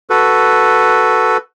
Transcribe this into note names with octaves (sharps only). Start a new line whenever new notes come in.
F#4 A4 B4